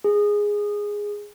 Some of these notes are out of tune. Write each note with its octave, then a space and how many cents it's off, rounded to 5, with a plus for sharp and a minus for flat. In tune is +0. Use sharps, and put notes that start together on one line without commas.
G#4 -5